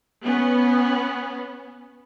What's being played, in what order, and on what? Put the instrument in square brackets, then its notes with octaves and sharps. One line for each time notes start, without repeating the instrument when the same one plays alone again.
[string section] B3 C#4